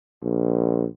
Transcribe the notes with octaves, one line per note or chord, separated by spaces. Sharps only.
A#1